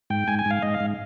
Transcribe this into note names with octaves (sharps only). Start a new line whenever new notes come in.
G#2 G5
G#2 G#5
G#5
G#2
F5
G#2 D#5
F5
G#2